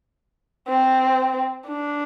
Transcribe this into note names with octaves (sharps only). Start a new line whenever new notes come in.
C4
D4